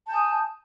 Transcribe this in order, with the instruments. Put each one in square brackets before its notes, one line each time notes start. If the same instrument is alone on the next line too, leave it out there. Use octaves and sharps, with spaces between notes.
[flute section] A5
G6
G#5
D#6